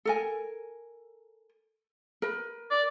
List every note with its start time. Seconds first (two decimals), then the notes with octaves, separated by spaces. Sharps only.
0.05 A4 A#4 G#5
2.22 A#4 B4
2.71 D5